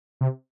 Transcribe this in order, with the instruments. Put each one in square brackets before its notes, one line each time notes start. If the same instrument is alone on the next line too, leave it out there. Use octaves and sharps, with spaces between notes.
[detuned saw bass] C3